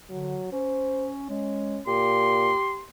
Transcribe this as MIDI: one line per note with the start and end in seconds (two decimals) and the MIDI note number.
0.10 0.39 50
0.10 0.51 54
0.52 1.28 61
0.52 1.08 72
1.29 1.78 56
1.29 1.82 61
1.87 2.53 46
1.87 2.85 67
1.87 2.83 84